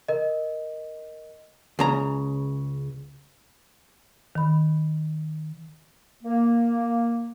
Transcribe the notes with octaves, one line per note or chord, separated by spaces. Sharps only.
A#4 D#5
C#2 C#3 A#5
D#3 B5
A#3